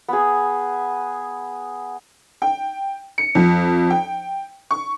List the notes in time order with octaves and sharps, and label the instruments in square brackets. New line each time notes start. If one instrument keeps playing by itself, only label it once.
[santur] B3 G#4
[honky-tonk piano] G5
C#7
F2
G5
C#6